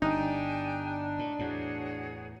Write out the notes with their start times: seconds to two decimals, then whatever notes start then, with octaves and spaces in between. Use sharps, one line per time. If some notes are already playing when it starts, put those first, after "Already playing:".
0.02 G1 D4 D#4 G4 G5 G#5
1.19 A2
1.39 E2 A2 F#4 G#4 C#5